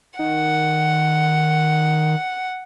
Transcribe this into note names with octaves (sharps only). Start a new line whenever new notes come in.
D#3 F#5